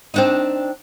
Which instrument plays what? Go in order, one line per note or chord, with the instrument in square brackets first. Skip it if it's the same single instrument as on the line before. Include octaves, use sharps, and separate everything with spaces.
[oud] C4 D4 D#4